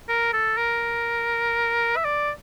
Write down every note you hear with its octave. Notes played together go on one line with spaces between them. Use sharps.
A#4
A4
A#4
E5
D5